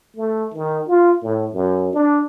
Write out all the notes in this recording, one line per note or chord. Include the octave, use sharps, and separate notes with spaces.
A3
D#3
F4
A2
F#2
D4